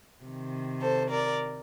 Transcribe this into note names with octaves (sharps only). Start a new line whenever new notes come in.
C3 D#3
A4 C5
A#4 D5